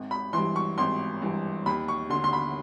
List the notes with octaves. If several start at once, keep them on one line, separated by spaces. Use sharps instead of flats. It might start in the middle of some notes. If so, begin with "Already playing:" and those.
Already playing: G#1
B5
G2 E3 C6
C#6
G#1 C6
G2 E3
D#2 B5
C#6
D3 C6
C6
B5